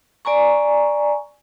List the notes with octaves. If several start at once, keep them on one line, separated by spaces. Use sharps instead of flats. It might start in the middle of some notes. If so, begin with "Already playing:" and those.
D5 G#5 A#5 C#6